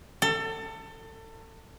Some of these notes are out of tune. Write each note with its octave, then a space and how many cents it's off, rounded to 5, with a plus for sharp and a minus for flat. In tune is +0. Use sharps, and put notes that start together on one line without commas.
A4 +30